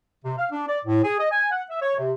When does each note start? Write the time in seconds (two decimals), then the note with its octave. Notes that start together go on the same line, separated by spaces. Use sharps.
0.24 C3
0.38 F5
0.51 D4
0.68 D5
0.85 A2
1.04 G#4
1.19 D#5
1.31 G#5
1.52 F#5
1.70 E5
1.82 C#5
1.97 C3